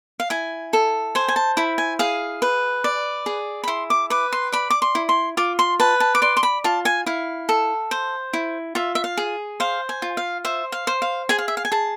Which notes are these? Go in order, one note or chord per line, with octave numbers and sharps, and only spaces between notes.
F5
E4 G#5
A4
C5 G#5
G#5
A5
E4 B5
G#5
G#4 F5
B4
D5
G#4
B5
E4 C6
D6
B4 D6
C6
D5 B5
D6
C6
E4
C6
F4 D6
C6
B4 A5
A5
D6
D5 C6
C6
B5
F4 A5
G#5
E4 F5
A4
C5
E4
F4 E5
E5
F5
G#4
C5 F5
G#5
F4
F5
C5 E5
F5
C5
F5
G#4 G#5
F5
E5
F5
G#5
G#4 A5